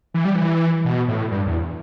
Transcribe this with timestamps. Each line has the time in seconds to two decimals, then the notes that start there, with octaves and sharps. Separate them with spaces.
0.14 E3
0.25 G3
0.35 E3
0.85 B2
1.08 A2
1.31 G2
1.46 E2